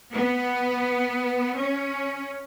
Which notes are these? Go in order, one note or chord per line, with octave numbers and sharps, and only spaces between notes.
B3
C#4